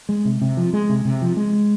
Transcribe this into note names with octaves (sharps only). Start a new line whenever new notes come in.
G#3
C3
C3
F3
G#3
C3
C3
F3
G#3